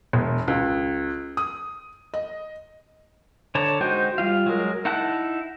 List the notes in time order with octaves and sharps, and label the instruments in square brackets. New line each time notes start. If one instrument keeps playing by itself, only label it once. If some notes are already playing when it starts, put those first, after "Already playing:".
[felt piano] E1
C#2
D#6
D#5
[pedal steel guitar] D3 C#5 A5 A#5
G#3 D#4 F#4 C5 G5
G3 F4 F5
F#3 G#3 A#4
D#4 E4 F#5 A5 F#6